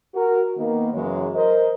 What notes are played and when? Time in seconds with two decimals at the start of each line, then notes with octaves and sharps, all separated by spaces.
0.14 F#4 A#4
0.57 D#3 A#3 B3
0.93 F#2 C#3 E3 F#3 G#3 C#5
1.34 A#4 C5 D#5